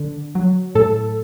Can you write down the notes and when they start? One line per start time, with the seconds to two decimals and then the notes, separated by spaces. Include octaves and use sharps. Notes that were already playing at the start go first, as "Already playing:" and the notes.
Already playing: D3
0.35 F#3
0.75 A2 A4